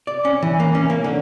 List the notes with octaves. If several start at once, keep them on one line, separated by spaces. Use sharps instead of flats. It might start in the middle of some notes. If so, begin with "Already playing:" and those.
D5
C#4
E3
A#3
C#4
A#3
D3